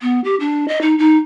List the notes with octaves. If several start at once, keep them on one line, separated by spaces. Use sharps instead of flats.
B3
G4
D4
D#5
D#4
D#4